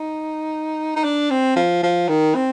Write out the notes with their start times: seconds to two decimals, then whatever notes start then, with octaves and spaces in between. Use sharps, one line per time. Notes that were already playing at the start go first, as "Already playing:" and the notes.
Already playing: D#4
0.96 D#4
1.04 D4
1.31 C4
1.56 F3
1.83 F3
2.09 D#3
2.35 C4